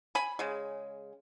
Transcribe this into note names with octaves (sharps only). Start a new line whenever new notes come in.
G#5 B5
C#3 G#3